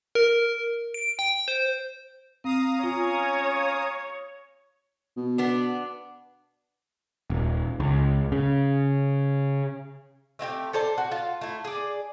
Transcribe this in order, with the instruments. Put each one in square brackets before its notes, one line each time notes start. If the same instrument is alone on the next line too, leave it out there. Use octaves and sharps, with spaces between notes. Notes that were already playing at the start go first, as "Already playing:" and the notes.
[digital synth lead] A#4
D7
G5
C5
[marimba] C4 [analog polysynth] F5 A#5 D#6
[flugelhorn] C#4 [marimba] F4 [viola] C#5
[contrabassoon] B2
[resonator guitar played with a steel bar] B3 D4
[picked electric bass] D#1
C#2
C#3
[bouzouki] A3 C4 E4 G4
A4 C5 D5 A5
F#4
F4 A5
A3 E4
G#4 D5